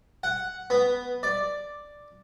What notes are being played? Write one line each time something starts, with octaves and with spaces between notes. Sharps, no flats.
F#5
B3
D5